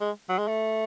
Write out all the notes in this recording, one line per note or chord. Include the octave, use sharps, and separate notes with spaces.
G#3
F#3
G#3
A3